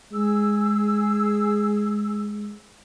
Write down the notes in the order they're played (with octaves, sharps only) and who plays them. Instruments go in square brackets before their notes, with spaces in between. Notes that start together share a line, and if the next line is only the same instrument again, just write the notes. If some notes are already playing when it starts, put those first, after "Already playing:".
[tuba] G#3 [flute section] G#4 E6